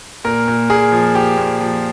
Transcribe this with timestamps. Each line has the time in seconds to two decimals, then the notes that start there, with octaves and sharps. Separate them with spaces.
0.25 A#2 A#4
0.48 A#2
0.70 A#2 G#4
0.92 F3
1.15 F3 G4
1.37 A#2
1.60 F3